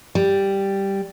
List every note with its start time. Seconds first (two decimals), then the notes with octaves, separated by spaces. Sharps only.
0.15 G3